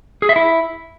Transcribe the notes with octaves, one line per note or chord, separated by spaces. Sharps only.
G#4
E5
E4